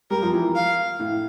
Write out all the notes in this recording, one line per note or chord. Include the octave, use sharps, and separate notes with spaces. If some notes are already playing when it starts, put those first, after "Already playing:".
G3 A#4
F3
E3
F5
A2